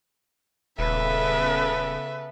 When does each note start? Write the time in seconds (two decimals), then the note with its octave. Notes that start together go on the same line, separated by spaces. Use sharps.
0.79 D#1 C#3 B3 A4 B4 E5